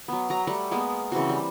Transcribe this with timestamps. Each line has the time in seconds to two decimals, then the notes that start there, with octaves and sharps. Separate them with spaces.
0.08 F#3 B3
0.30 F#3 A#5
0.47 G3 A3 F#5
0.71 G#3 A#3 B3
1.12 C#3 E3 C4 F#4
1.29 G3